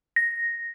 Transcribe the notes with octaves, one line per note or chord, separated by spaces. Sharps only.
A#6